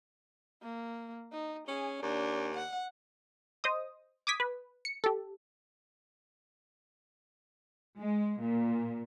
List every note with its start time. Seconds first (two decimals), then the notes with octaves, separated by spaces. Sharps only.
0.63 A#3
1.32 D#4
1.68 C#4 G#4
2.03 D#2 D4
2.55 F#5
3.64 C5 D#5 D#6
4.27 D6 D#6 G#6 B6
4.40 B4
4.85 C#7
5.04 G4 A4
7.98 G#3
8.41 A#2